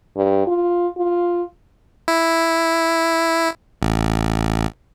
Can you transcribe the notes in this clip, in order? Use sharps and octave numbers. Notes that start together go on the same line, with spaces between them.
G2
F4
F4
E4
A1